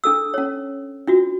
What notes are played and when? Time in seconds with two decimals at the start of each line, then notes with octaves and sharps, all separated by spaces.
0.04 D4 A4 E6
0.34 C#4 C#5
1.07 D4 F4 F#4